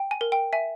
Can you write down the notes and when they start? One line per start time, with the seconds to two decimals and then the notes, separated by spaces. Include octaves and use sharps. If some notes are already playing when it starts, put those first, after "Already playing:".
Already playing: G5
0.11 G#5
0.21 A#4
0.32 G5
0.53 E5 G#5